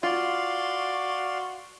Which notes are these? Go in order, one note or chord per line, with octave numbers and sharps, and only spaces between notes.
F4 F#4 D5 F5 C6